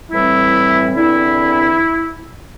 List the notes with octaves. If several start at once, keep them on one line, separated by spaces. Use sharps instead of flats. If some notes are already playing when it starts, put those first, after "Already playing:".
A2 E3 G3 C4 E4
E2 D3 C4 E4